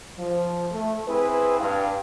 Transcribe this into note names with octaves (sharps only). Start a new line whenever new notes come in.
F3
A3
C4 E4 G#4 B4
G2 F5